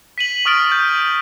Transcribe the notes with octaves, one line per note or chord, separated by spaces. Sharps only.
B6 D#7 F#7
C#6 D#6 F6 A6 D7 F#7
G6